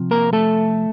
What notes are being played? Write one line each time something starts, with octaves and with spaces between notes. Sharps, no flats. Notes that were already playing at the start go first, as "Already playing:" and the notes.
Already playing: C3 F3
A#3 A#4
A3 A4